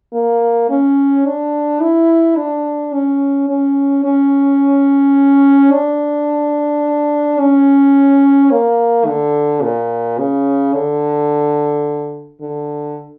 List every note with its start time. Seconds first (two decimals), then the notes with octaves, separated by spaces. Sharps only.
0.14 A#3
0.69 C#4
1.26 D4
1.81 E4
2.37 D4
2.93 C#4
3.49 C#4
4.04 C#4
5.71 D4
7.39 C#4
8.51 A#3
9.07 D3
9.62 A#2
10.18 C#3
10.74 D3
12.41 D3